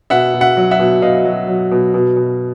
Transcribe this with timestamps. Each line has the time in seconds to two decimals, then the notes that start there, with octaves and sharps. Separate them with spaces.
0.10 B2 E5 F#5
0.34 B2
0.41 E5 F#5
0.57 F#3
0.71 E5 F#5
0.79 B2
1.02 B2 D#5 F5
1.25 F#3
1.48 F#3
1.71 B2
1.94 B2
2.17 B2